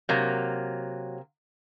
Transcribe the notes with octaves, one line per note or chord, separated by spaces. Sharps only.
C3 F#3 A#3